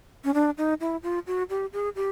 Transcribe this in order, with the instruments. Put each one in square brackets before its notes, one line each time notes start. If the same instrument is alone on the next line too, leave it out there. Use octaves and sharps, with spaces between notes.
[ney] C#4
D4
D#4
E4
F4
F#4
G4
G#4
G4